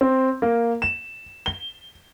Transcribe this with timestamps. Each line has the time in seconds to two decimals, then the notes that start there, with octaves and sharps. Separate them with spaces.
0.01 C4
0.42 A#3
0.82 E7
1.46 G7